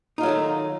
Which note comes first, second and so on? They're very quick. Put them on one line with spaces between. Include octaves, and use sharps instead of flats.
D#4 F4 F#3 A3 D#3